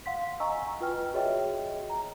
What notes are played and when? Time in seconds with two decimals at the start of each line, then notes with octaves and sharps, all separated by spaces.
0.06 F5 F#5 C6 B6
0.40 D#5 G#5 A#5 C#6 E6
0.81 F4 B4 G5 F6
1.13 F#4 G#4 C#5 D#5 E5 G5
1.90 A#5